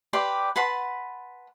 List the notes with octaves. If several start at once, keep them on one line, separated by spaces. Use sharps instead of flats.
G4 B4 D5 C6
B4 F#5 A5 C6